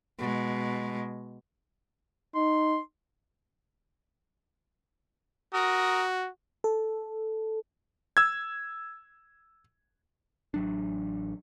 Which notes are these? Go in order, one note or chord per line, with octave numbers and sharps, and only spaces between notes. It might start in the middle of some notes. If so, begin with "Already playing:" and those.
B2 G#3
D#4 C6
F#4 A#4 D#6
A4
E6 G#6
A1 F#3 D4